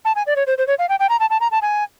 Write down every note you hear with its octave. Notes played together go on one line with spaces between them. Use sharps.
A5
G#5
D5
C#5
C5
C5
C#5
F5
G5
G5
A#5
A5
A5
A#5
A5
G#5